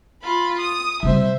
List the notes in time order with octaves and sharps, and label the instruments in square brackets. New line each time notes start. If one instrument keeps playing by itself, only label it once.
[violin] F4 B5
D#6
[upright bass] C3 G3 [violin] C5 E5